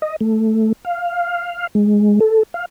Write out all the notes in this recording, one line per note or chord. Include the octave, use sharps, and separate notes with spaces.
D#5
A3
F5
G#3
A4
F5